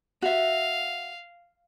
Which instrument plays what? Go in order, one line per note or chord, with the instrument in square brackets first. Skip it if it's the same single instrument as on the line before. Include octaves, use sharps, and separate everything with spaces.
[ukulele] F#4 E5 [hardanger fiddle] F5